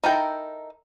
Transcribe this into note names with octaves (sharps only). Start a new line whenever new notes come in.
D#4 E4 A4 A#4 G5